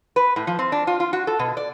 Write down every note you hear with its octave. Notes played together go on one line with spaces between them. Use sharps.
B4
A2
F3
C4
D4
F4
F4
F#4
A4
B2
D5